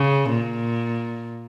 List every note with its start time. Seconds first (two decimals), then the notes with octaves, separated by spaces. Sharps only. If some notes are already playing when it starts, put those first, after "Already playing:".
Already playing: C#3
0.30 A#2